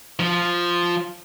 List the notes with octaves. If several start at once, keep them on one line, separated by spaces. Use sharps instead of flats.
F3